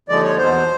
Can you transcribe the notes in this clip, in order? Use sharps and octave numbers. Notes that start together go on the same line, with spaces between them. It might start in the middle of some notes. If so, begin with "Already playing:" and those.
D#2 D3 F3 G#3 D5
C#5
E2 B2 F#3 C5